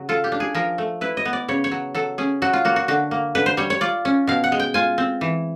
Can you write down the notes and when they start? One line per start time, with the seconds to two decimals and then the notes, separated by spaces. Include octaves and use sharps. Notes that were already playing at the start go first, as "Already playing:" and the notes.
Already playing: C#3 F#3
0.09 F4 A4
0.24 G4
0.32 D4
0.40 G#4
0.55 F3 A#4
0.78 A3
1.01 E4 B4
1.17 D#5
1.25 B3
1.33 D5
1.48 C#3 C#5
1.64 C#5
1.71 F#3
1.95 F#3 A4
2.18 C#4 G#4
2.42 F#3 F#4
2.53 F4
2.65 A#3 F#4
2.76 F#4
2.88 D3 F#4
3.11 A#3
3.35 D3 B4
3.46 C5
3.57 G3 C#5
3.70 C#5
3.81 F4 D5
4.05 C#4
4.27 B2 F5
4.44 F#5
4.52 G#3
4.60 G5
4.74 F4 G#5
4.98 C4
5.21 E3